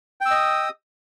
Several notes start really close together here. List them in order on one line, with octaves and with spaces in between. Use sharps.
G5 E6 D#5 D#6